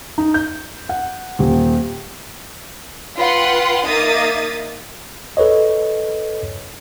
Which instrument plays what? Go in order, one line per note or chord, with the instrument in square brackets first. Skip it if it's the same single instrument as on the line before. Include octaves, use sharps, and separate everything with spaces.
[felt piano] D#4
G6
F#5
D#1
[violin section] F4 B4 F#5 G5 C6
A#3 D#4 E5 D#6 A6
[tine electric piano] A4 B4 C#5 D#5